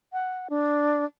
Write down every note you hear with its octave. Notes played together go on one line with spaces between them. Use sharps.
F#5
D4